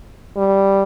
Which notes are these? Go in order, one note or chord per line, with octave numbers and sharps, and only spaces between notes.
G3